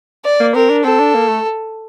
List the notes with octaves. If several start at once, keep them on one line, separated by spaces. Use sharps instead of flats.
D5
A#3
C4 A#4
D4
C4 A4
D4
A#3
A3